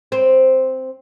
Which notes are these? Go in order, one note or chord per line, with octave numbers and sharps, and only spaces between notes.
C4